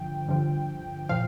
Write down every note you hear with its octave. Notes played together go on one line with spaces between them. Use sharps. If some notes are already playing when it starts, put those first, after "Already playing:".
Already playing: G2 D3 F3 G5
G2 D3 F3
A#2 F3 F5